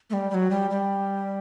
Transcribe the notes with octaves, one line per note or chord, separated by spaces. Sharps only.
A3
G3
G3
F#3
G3
G3